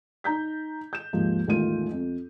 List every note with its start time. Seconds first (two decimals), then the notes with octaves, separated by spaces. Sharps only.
0.24 D#4 A#5 G6 B6
0.93 G6 E7
1.13 D#2 G#2 F3
1.47 E1 A1 D#3 A3 F4 D#7
1.92 F2